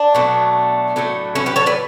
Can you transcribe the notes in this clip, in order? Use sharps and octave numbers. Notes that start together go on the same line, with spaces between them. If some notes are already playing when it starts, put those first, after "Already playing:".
Already playing: D4
B2 F#3 A3
A2 F#3 A3
C#4 E4
G4 B4
A4 C#5
B4 D5